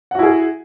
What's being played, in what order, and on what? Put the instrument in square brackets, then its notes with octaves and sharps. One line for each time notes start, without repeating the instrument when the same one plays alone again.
[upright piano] F#5
F#4
E4
G#4